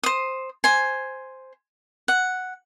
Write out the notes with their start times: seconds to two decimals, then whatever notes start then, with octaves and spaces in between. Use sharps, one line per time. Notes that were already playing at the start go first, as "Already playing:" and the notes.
0.03 C5 D#6
0.64 C5 G#5
2.08 F#5